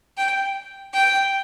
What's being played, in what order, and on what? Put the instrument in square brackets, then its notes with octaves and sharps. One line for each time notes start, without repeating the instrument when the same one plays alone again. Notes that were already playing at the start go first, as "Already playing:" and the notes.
[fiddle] G5
G5